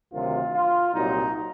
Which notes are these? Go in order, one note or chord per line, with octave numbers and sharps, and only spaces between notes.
D2 C3 D#3 F#3 F4
F4
C2 A#2 F#3 D#4